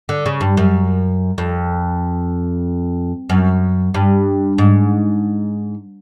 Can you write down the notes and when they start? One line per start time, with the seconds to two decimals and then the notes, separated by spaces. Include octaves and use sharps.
0.09 D3
0.26 C#3
0.41 G2
0.57 F#2
1.38 F2
3.29 F#2
3.94 G2
4.58 G#2